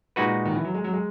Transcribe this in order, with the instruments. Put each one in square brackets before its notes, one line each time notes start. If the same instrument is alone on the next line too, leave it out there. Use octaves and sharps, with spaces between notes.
[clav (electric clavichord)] A#2 G#3 D#4 F#4 B4
[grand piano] D#3
E3
F#3
G#3
F#3
G#3